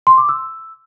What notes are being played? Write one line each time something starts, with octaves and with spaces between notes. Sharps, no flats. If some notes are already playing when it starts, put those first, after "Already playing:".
C6
D6
E6